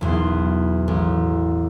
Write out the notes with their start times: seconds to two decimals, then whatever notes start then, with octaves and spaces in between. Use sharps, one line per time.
0.01 B1 E2 B2 C6
0.88 A1